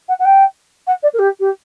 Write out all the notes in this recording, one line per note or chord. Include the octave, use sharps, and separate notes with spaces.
F#5
F#5
G5
F#5
D5
A#4
G4
G4